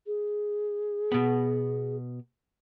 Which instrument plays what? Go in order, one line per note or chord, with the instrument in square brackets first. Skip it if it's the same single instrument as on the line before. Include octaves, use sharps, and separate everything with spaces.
[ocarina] G#4
[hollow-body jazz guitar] B2 B3